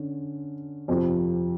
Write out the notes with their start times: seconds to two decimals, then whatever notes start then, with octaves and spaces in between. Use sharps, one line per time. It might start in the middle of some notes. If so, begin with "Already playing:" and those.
Already playing: D3 C#4
0.88 F2 C3 F3